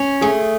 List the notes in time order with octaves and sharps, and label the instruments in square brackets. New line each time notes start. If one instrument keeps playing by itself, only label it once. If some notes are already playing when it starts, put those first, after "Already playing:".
Already playing: [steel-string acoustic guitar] C#4
[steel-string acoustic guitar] A3 [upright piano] G#4